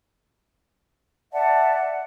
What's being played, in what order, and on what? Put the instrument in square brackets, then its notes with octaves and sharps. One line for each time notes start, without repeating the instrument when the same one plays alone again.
[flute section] D5 E5 F#5 A5